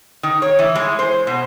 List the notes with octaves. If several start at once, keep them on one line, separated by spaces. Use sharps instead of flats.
D#3
C#5
E3
G#3
C5
B2